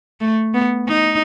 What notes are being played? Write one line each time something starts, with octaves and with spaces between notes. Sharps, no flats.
A3
B3
D#4